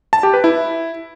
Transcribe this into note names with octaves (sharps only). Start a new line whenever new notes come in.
A5
G4
B4
E4